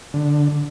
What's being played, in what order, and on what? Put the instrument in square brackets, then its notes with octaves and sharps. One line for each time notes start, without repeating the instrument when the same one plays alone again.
[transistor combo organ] D3